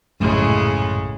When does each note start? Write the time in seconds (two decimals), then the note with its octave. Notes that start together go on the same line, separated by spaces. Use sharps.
0.20 A#1 F#2 A2 C#3 G#3